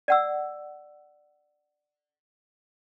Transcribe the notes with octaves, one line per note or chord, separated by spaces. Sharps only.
D5 F#5 E6